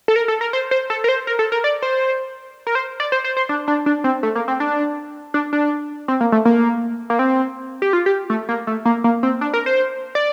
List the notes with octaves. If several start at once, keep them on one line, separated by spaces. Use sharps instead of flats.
A4
A#4
A4
A#4
C5
C5
A4
A#4
C5
A#4
A4
A#4
D5
C5
A#4
C5
D5
C5
C5
C5
D4
D4
D4
C4
A3
A#3
C4
D4
D4
D4
C4
A#3
A3
A#3
A#3
C4
G4
F4
G4
A3
A#3
A3
A#3
A#3
C4
D4
A#4
C5
D5